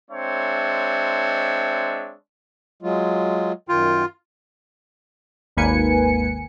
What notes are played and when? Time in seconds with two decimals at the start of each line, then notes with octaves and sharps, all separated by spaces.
0.11 G#3 C4 D4 C#5 E5
2.82 F#3 G#3 F4
3.69 F#2 D#3 F4 G5
5.57 G#1 D#2 A#3 B4 G#5 C#7